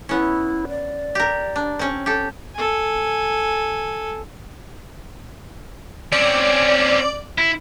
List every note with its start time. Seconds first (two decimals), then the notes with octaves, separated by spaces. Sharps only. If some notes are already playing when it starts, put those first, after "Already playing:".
0.09 B3 C#4 E4
0.68 D5
1.15 G4 A#4
1.56 D4
1.79 C4 C#4
2.06 G4 A4
2.55 A4 G#5
6.12 C4 C#4 D5
7.38 E4